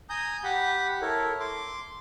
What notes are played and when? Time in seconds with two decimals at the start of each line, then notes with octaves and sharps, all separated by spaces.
0.10 G#5 A#5 D#6 G6
0.44 G4 F#5 B5
1.02 E4 A4 A#4 C#5
1.40 C6 D6